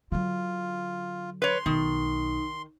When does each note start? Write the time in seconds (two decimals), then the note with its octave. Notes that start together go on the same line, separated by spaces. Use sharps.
0.12 D3 F#3 F4
1.42 B4 C#5 C6
1.66 B1 D#3 D#4